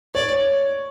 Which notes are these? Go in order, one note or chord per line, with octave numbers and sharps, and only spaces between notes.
C#5 D5